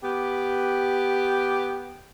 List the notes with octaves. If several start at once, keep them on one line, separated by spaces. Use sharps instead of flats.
B3 G4